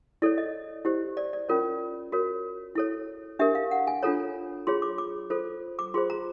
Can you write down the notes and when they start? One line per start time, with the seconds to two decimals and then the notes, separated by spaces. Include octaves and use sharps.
0.22 E4 A4 C#5 D5
0.38 D#5
0.85 E4 G4 C5
1.17 D5
1.33 D5
1.49 C#4 F4 A#4 C#5
2.12 F#4 A#4 C#5
2.75 E4 A4 C#5
3.39 D4 G4 A#4 E5
3.55 F5
3.71 F#5
3.87 G#5
4.03 D4 F4 A4 C#5 A#5
4.67 F4 G#4 C#5 C6
4.82 D6
4.98 D6
5.30 F4 A4 C5
5.79 D6
5.94 F4 G#4 C5 C6
6.10 A#5